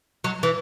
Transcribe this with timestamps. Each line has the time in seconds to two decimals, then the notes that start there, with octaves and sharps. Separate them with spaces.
0.24 F#3
0.43 E3